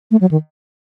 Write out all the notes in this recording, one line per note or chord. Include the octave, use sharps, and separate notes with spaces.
A3
F#3
D#3